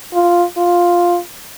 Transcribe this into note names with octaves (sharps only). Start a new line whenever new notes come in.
F4
F4